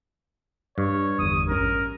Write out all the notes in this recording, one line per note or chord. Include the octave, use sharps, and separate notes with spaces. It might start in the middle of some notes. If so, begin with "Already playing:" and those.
G2 C#5
G1 E2 D#6
A1 C#4 A#4